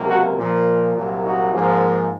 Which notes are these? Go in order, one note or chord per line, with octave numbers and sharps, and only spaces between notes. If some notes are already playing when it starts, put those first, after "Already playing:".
Already playing: C#2 C3 F#3 A#3
F#4 A#4
A#2 F3 A#3
C2 A#2 F#3
D#4 F#4
G#2 F3 A#3